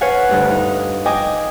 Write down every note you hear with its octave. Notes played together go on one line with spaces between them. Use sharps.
B4 C#5 F5 F#5 G#5
D2 G2 D4
D#4
D#5 G5 G#5 D6 D#6